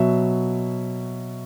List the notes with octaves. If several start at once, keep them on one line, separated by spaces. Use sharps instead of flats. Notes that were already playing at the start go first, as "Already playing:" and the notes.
Already playing: B2 F#3 E5